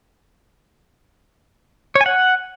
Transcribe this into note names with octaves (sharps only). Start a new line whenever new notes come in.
C#5
G#5
F#5